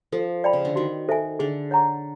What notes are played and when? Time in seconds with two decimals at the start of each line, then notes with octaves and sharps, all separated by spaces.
0.12 F3 A4
0.44 D5 G5 B5
0.53 C#3
0.65 D3
0.76 D#3 F#4
1.09 A4 C5 E5 G#5
1.39 D3 G#4
1.71 C#5 F#5 A#5 C#6